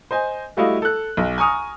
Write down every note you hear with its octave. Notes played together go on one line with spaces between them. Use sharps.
C5 D#5 G#5
G3 A3 E4 F#4 D#5 F5
A4 F#6
B1
G#5 A#5 C#6 D#6 F6